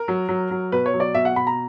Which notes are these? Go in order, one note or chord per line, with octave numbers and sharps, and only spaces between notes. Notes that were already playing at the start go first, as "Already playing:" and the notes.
Already playing: A#4
F#3
F#3
F#3
B2 B4
C#5
F#3
D5
B2 E5
F#5
B2 B5
A#5